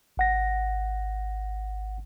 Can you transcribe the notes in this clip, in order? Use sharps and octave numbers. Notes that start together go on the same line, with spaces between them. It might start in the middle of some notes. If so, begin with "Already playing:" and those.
G#1 F#5 A#6